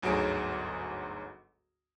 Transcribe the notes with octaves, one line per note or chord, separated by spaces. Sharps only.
G1 D2 G#2 F#3 G#4 D7